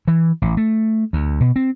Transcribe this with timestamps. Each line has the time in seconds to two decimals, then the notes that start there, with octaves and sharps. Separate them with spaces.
0.08 E3
0.42 A1
0.57 A3
1.13 D2
1.40 B2
1.56 C4